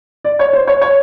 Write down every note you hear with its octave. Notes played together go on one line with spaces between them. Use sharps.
D5
C#5
C5
C#5
C#5